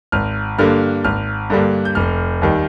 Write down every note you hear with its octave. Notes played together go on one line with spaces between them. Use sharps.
G#1 F6
G2 D3 G3 A#3 F6
G#1 F6
G2 D3 G3 A#3
G6
F1 F6
D#2 D#3 G3